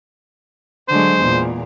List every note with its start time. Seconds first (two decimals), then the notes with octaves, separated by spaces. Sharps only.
0.89 D3 F#3 G#3 C5
1.20 E2 A#2